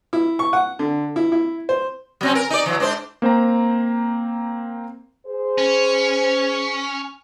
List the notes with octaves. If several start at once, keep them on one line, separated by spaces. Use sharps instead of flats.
E4
C#6
F#5
D3
E4
E4
C5
F#3 C4 C#4
A#4
D#4 D5
E3 F#3
G#2 D4 C5
A#3 C4 C5 G5 A#5
G#4 C5
C#4